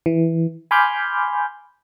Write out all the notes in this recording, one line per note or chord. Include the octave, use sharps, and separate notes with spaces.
E3
G#5 B5 C6 D6 F6 G6